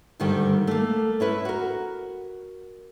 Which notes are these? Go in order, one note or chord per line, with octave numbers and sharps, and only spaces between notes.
D2 G2 D3 D#3 G3 G4
A3 A#3
C#4 E4 B4
F#4 A#4